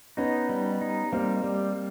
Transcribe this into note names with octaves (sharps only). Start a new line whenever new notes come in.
B3 C#4 D#4
G3
D#4
G3 A#3 C4
G3